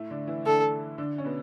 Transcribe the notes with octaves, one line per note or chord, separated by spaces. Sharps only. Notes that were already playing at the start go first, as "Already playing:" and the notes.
Already playing: A2 A3
D3 D4
E3 E4
D3 D4 A4
D3 D4
C#4
B2 B3